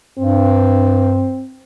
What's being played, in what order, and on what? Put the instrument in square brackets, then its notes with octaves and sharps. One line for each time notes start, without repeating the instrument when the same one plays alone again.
[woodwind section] G2 [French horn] C4